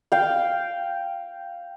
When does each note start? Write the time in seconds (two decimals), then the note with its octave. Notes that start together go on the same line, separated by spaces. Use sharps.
0.12 F5 G5